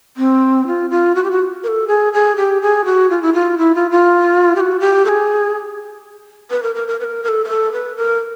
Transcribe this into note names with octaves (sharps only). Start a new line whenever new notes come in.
C4
F4
F4
F#4
G4
F#4
A#4
A4
G#4
G#4
G4
G#4
F#4
F4
E4
F4
E4
F4
F4
G4
F#4
G4
A4
G#4
B4
A#4
A#4
A#4
B4
A#4
A#4
A4
A#4
A4
B4
A#4